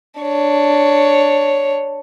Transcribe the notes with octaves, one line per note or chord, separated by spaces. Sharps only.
D4 C#5